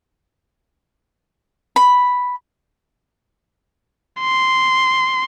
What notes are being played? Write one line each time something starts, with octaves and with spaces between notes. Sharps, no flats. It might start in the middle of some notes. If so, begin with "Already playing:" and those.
B5
C6